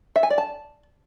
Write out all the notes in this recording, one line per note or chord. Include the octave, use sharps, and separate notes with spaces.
E5
G#5
D5
A5